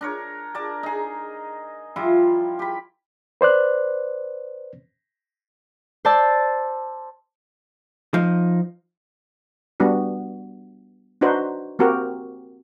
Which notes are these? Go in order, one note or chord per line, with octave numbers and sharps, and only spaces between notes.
D4 A#4 C#5
A#4 D5 A5
D#4 G#4
F3 G3 E4 F4
G4 B5
B4 C5 D5 F#6
C5 D5 A5 E6 A6
F3 D#4
G3 B3 D4 F#4
D4 D#4 F#4 B4 C5
A#3 C4 F#4 G4 A#4